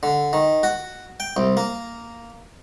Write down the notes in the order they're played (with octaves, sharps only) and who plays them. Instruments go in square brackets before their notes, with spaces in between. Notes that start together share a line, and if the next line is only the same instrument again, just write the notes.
[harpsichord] D3
D#3
F#4
G5
C2
A#3